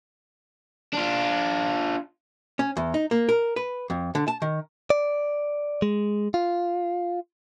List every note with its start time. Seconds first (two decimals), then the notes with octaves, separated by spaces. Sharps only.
0.93 D4 F4
2.59 C#4
2.77 E2
2.94 D#4
3.11 A#3
3.29 A#4
3.56 B4
3.90 F2
4.15 D3
4.28 A5
4.42 D#3
4.90 D5
5.82 G#3
6.34 F4